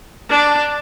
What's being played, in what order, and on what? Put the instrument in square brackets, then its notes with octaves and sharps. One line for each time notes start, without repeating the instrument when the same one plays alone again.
[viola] D4